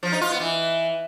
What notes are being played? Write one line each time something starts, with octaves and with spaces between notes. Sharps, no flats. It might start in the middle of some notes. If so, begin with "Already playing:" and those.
F3
D#4
F4
B3
E3